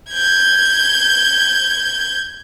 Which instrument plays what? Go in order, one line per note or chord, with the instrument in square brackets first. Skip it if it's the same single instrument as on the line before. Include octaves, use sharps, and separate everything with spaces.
[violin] G6 G#6